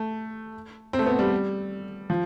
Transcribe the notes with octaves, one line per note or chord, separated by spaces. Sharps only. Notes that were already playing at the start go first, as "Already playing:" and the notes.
Already playing: A3
C4
A3
B3
G3
F3